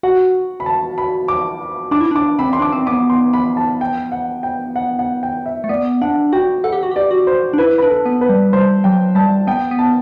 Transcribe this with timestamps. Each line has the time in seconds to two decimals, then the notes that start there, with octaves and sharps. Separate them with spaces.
0.03 F#4 F#5
0.60 B5
0.66 A5
0.98 B5
1.28 D6
1.91 D4 D6
2.01 E4
2.11 D4 D6
2.39 C4 B5
2.53 C6
2.59 D4 D6
2.72 C4
2.87 B3 D6
3.10 C6
3.33 B5
3.57 A5
3.81 G5
4.12 F#5
4.43 G5
4.76 F#5
4.99 F#5
5.23 G5
5.46 E5
5.64 A3
5.69 B3 D5
6.01 D4 F#5
6.33 F#4 G5
6.64 A4 F#5
6.73 G4
6.83 F#4
6.91 G4 D5
7.11 F#4
7.27 C5
7.53 D4
7.58 E4 B4
7.78 D4 B4
7.90 A4
8.06 B3
8.21 B4
8.29 G3
8.53 G3 C5
8.84 F#3 G5
9.15 G3 A5
9.47 B3 G5
9.71 B3
9.79 A5